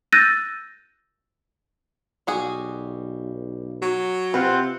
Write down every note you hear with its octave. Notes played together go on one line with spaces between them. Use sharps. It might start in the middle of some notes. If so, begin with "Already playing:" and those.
E6 F#6 G6 A6 A#6 D#7
B1 G3 F#4 G#4
F#3
C3 C4 F4 B4 F#5